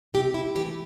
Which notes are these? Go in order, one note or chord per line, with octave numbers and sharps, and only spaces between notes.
C3 G4
E4
E3 A3 G4